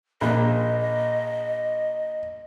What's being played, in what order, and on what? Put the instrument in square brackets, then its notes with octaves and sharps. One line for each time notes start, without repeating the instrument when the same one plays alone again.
[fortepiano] A#1 [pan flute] D#5